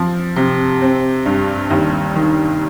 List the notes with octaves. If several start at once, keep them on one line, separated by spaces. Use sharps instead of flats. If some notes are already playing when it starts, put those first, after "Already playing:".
Already playing: F3 C4
C3
C4
G2
D#2
D#3